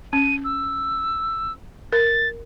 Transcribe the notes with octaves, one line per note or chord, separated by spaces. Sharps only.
C#4 D#7
E6
A#4 A6